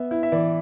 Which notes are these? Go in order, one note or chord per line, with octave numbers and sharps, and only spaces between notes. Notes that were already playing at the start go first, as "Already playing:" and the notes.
Already playing: B3 E5
E4
E5
E3 D5